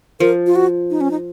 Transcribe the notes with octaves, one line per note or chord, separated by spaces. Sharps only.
F3 A#4
F4
F#4
D#4
C#4
D#4